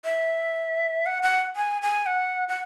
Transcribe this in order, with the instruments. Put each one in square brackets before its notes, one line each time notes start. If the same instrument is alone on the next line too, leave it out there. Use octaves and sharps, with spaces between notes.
[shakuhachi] E5
F#5
F#5
G#5
G#5
F#5
F#5